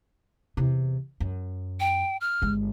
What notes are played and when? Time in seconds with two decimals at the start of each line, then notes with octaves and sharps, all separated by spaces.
0.57 E2 C3
1.20 F#2
1.80 G5
2.21 F6
2.42 G1 G#3